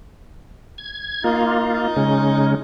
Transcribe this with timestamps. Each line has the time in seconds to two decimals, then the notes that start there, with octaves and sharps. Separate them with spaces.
0.78 G#6
1.24 A#3 D#4 F4
1.96 C#3 G#3 C#4